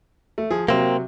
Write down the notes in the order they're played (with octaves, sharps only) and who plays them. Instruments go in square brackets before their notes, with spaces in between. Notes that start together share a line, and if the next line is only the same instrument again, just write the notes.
[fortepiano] A3
F3 G#4
[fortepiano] C3 F#3 [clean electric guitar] A#3 C4